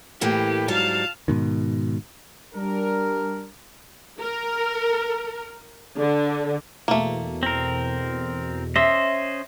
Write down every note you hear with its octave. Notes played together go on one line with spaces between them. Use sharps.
A2 E3 A#3 G4
G#2 F#3 G3 F5 A5
G#2 B2 D#3
G3 D4 A#4
A#4
D3
E2 B2 A3 A#3
C4 A#4
C#4 C5 D#5 E5